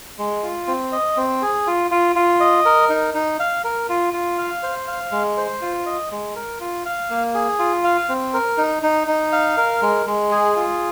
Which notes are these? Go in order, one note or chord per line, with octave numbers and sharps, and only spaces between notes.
G#3
F4
C4
D#5
C4
G#4
F4
F4
F4
D#5
A#4
D#4
D#4
F5
A#4
F4
F4
F5
C5
F5
G#3
C5
F4
D#5
G#3
A#4
F4
F5
A#3
G#4
F4
F5
C4
A#4
D#4
D#4
D#4
F5
A#4
G#3
G#3
G#4
F4